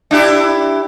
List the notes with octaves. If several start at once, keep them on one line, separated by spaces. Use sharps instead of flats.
D4 E4 G4